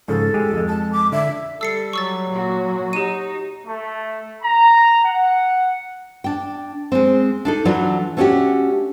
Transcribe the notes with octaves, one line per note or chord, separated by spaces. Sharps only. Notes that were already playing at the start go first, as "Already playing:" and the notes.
G#2 C#3 F3 A4
G#3 G4 G#4
F2 G#3
A5
D6
D3 E5
G3 A4 E6 C7 C#7
F#3 C#6 E6 A6
A#2 F#4
D#4 F#4 G4 D#7
A3
A#5
F#5
D4 G5
G#3 C4
D4 D#4 A4
E3 F#3 A3 D4 F4 D5
A3 B3 C#4 D4 F#4 G4